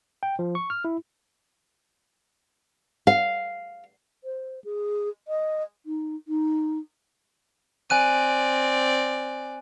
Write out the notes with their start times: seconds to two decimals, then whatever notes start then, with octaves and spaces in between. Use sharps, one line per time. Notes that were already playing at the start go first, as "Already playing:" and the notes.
0.23 G5
0.39 F3
0.55 C#6
0.70 F6
0.85 E4
3.07 F5
4.24 C5
4.64 G#4
5.28 D#5
5.86 D#4
6.28 D#4
7.90 C4 D5 G#5 F#6 D#7